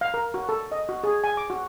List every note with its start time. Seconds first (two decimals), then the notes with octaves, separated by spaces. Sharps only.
0.01 F5
0.14 A#4
0.34 F#4
0.49 A4
0.72 D#5
0.89 F#4
1.04 G#4
1.24 G#5
1.37 D6
1.50 F#4